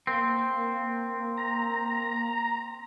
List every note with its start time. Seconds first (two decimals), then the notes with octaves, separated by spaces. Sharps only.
0.07 A#3 C4
1.37 A#5